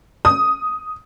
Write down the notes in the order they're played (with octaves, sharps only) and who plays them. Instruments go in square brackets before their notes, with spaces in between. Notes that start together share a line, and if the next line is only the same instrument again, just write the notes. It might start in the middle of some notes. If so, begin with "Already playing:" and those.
[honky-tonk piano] D#6